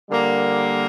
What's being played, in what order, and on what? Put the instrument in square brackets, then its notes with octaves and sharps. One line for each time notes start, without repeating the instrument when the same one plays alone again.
[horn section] D3 G3 A#3